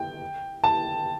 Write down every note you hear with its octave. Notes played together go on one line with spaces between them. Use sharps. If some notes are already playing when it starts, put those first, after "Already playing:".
Already playing: G5
A5